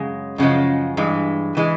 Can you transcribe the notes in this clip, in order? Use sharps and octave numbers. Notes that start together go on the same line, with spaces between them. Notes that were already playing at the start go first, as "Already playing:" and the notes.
Already playing: F#2 C#3 G#3
F#2 C#3 F3 G#3
G2 E3 G#3
E3 G#3